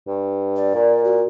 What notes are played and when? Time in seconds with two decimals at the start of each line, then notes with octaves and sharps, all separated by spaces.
0.07 G2
0.56 D5
0.75 A#2
1.05 F#4